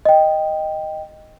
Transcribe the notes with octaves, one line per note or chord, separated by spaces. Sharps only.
D#5 G5